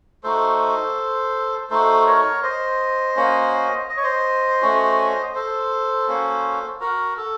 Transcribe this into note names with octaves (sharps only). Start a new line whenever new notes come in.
A3 D#4 F#4 A4 C5
A3 D#4 F#4 A4 C5
A#4 C#5
C5 D#5
A#3 C#4 F#4
D#5
C#5
C5 D#5
A3 C#4 F#4
A4 C5
A#3 C#4 F#4
F#4 A#4
A4